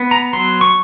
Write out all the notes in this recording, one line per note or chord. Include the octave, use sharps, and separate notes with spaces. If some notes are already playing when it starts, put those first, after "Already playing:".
Already playing: B3
A#5
F#3 C6
C#6